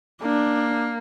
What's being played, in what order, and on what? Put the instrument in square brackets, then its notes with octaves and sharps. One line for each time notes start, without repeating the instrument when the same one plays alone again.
[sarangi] A#3 [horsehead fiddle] D4